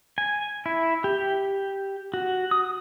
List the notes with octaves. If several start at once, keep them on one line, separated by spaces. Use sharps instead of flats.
G#5
E4
G4
F#4
D#6